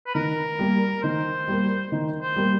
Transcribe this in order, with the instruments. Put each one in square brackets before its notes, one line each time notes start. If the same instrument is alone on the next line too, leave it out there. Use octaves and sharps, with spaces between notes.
[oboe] B4
[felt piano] D#3 [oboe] A#4
[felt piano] G3 A#3
[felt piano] D#3 [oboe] C5
[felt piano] G3 A#3
D#3
[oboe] C5
[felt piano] G3 A#3